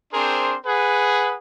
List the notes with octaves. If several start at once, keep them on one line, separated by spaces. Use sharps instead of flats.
C4 D4 G#4 A#4 C5 C6
G#4 B4 F#5